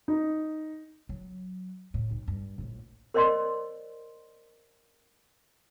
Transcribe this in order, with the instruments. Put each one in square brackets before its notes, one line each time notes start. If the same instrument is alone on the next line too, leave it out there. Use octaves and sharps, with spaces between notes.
[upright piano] D#4
[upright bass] F#3
A2
B1
G2
A#1 A2
[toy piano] A#4 C5 D5 D#5 C6